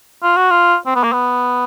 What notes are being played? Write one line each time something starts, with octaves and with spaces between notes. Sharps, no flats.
F4
F#4
F4
C4
B3
A#3
B3